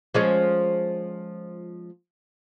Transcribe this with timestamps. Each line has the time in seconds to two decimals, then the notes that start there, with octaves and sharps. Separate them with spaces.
0.14 F3 G#3 C#4